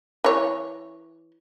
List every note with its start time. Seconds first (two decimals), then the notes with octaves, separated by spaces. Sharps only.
0.24 E3 C#5